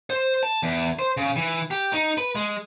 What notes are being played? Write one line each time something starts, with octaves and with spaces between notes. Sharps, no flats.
C5
A5
E2
C5
C#3
E3
G4
D#4
B4
G#3